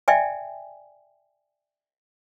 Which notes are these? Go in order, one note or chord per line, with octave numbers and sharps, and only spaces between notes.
D5 E5 G5 G#5